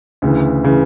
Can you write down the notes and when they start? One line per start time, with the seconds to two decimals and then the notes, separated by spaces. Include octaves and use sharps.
0.22 D2 C#3 E3
0.64 C#3 E3